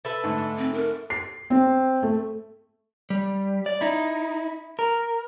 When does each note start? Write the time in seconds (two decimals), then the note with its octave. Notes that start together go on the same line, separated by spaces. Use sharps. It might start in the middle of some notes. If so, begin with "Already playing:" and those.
0.05 A4 B4 E5
0.23 G#2 D3 A3
0.58 C4
0.74 A#4
1.10 C7
1.50 C4
2.03 A3
3.10 G3
3.66 D5
3.81 D#4 E4
4.79 A#4